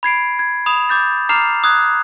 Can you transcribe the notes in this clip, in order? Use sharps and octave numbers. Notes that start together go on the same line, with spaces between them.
B5 G#6 C7 D7
G#6
B5 D#6 E7 F7
D6 G6 A6
A#5 D6 F6 C7 E7 F7
D#6 F#6 G#6